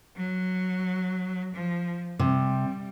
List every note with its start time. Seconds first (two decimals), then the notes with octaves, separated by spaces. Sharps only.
0.17 F#3
1.54 F3
2.19 C3 G3